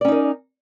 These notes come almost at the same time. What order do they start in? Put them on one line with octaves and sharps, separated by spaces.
D5 C#4 D#4 A#4